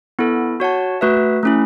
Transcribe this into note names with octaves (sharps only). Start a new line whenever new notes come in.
B3 E4 A4
F#4 C#5 F#5 A5
A3 F#4 B4 E5
A3 C#4 E4